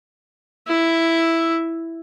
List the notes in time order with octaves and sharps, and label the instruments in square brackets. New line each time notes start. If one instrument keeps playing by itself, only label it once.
[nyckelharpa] E4 E5